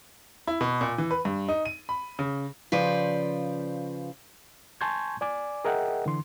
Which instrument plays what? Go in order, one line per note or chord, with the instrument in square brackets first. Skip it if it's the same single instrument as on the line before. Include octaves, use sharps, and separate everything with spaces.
[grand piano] E4
B2
A#2
E3
B4
G2
D#4
D#7
B5
C#3
[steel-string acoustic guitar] C#3 F3 B4 C5 D5
[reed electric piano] G#5 A5 C6 C#6 G6 G#6
D5 G#5 D6
G#4 A#4 D#5 E5 F#5 G5
D3 E3 C6